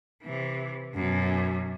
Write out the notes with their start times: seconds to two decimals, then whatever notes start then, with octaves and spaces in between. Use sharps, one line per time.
0.24 C3 E3
0.95 F#2 B2